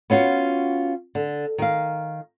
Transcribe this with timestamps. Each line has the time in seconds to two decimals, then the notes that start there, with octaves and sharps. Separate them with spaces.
0.10 B3 C#4 F4 F#4
1.15 D3
1.58 D#3 F5